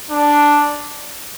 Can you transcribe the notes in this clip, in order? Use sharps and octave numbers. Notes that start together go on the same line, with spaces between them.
D4